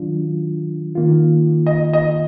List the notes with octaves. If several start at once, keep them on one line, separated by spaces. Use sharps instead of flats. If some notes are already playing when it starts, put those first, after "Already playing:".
Already playing: D#3 F#3 D4 F4
D#3 A#3 F4
D#5
D#5